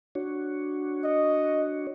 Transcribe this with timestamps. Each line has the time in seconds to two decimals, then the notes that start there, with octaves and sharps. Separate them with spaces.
0.15 D4 F#4 C#5
1.04 D#5